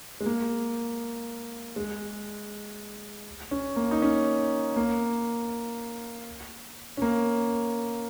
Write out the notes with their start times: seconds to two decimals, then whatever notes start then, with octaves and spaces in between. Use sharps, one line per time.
0.20 G#3
0.26 A#3
1.76 G#3
3.51 C#4
3.76 A#3
3.91 D#4
4.02 C#4
4.76 A#3
6.97 C#4
7.02 A#3